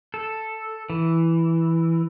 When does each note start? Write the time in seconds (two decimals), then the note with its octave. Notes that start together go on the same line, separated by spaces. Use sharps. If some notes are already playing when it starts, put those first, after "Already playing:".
0.14 A4
0.90 E3